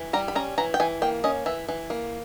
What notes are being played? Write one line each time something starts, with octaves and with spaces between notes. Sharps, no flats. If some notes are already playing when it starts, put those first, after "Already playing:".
Already playing: E3
G3 A#5
B5
C#4 A#5
E3 A#5
G5
E3 G#5
A#3 G5
C#4 D#5
E3 E5
E3
A#3